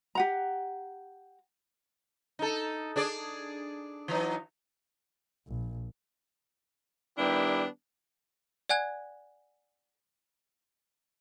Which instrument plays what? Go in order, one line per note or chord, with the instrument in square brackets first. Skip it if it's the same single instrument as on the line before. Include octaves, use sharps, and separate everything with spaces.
[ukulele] G4 F#5 A#5
[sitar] D#4 A4
D4 G#4 D5
E3 F#3 D#4
[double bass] A#1
[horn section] D#3 G3 B3 D4 E4 G4
[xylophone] D5 F#5 G#5 F#6 G#6